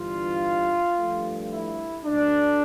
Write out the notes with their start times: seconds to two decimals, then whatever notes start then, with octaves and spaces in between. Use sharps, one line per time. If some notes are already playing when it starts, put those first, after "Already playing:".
Already playing: G1 G2 E3 G3 F4
0.97 G2 F3 A3
1.51 E4
2.06 D2 D3 A3 D4